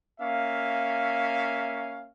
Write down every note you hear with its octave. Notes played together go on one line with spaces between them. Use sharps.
A#3 C#4 E5 F5